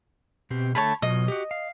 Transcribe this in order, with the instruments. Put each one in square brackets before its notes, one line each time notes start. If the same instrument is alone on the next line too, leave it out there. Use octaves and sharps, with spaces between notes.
[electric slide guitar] B2 C4 G4
[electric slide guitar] D3 A3 [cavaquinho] C#5 A5 B5
[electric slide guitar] B2 F#3 F4 [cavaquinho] D#5
[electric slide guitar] F#4 G4
F5